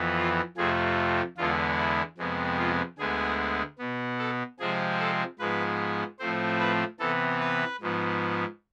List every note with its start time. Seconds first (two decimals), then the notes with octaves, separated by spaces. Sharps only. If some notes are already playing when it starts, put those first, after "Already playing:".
Already playing: F2 E3 B3
0.17 F4
0.57 F2 C3 F3 A3 G#4
1.37 E2 D3 G#3 B3 F4
1.78 E4
2.18 F2 C3 G#3 B3
2.58 F4
2.98 D2 D3 G#3 B3 G#4
3.79 B2 B3
4.19 A4
4.59 C3 F3 G#3 C4 G#4
4.99 A4
5.39 G#2 F3 G#3 B3 B4
6.19 A2 F3 A3 C4 C5
6.60 B4
6.99 C3 E3 B3 A4
7.40 B4
7.81 G#2 F3 B3